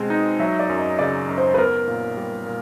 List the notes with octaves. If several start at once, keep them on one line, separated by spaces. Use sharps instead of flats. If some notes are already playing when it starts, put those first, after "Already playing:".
Already playing: B2 G#3 C4
D#4
F#3 E5
D5
F#2
D#5
C#3 D5
F#2
C5
B4
B3 A#4
A#2
G3
A#2